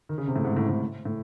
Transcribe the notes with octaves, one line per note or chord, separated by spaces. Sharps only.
D#3
C#3
C3
A2
G#2
A2
A2
A2